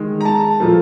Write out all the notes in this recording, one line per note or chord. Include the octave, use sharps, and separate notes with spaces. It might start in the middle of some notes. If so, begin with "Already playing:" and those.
Already playing: D#3 G#3
A#5
A5
A#2 F3 A3